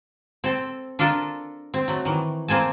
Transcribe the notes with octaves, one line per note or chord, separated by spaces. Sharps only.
C4 A4
D4 F4 A4 A#4
C4
F#3 A3
D#3 E3
A#3 C4 G#5 A5